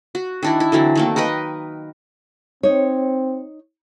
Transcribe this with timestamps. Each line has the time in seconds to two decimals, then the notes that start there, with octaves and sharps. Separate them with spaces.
0.15 F#4
0.43 D#3 D4 E4
0.60 E4
0.72 D3 E3 F#3 C4
0.95 D#3 A3 A#3
1.16 D#4 A#4 B4 D#5
2.63 C4 D#4 C#5